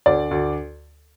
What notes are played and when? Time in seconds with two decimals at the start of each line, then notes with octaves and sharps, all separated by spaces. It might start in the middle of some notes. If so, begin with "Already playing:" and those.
0.06 D2 D5
0.31 D2